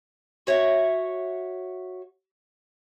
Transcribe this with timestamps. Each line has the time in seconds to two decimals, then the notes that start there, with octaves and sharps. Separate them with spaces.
0.47 F#4 C#5 E5 F#5